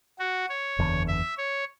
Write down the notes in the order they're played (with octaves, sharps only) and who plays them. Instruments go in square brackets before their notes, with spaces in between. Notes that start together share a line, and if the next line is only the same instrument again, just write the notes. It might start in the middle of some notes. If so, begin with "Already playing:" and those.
[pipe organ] F#4
C#5
[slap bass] F#1 E2 D3
[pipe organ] E5
C#5